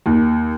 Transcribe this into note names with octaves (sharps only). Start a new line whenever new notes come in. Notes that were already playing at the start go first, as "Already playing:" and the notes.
D#2